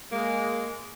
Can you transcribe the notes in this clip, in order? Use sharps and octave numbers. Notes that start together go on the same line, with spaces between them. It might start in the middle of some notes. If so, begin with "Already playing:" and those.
G#3 A#3